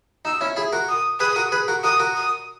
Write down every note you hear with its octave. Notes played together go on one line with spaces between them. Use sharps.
D#4 E6
C#4 E4
E4 G#4
F#4 A#4
D#6
G#4 B4 D#6
F#4 A#4
G#4 B4
F#4 A#4
F#4 A#4 D#6
F#4 A#4
D#6